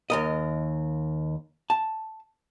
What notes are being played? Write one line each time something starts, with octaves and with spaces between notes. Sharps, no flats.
D#2 A#4 D#5
A5